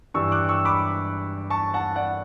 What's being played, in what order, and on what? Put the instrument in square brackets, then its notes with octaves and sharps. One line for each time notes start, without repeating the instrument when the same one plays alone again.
[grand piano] G2 E3 G3 C#6 E6
D6 F#6
C#6 E6
B5 D6
A5 C#6
F#5 A5
D5 F#5